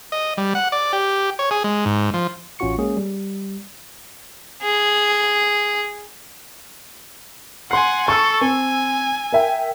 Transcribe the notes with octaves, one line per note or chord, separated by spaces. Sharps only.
D#5
G3
F#5
D5
G4
C#5
G#4
G#3
G#2
F3
A1 C#4 F4 F#4 C#6 C#7
G#3 A#3 C#4 G#4
G3
G#4
F#5 G#5 C6 C7
A4 C#6 E6
C4 G#5
A#4 E5 G5